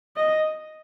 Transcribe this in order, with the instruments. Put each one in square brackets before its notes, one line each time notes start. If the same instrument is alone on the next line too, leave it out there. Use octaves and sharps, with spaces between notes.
[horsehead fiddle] D#5